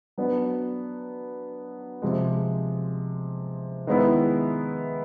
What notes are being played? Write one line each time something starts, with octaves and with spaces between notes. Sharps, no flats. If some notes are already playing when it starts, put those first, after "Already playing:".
F#3 B3 D4
C3 F3 G#3
D#3 G#3 B3 E4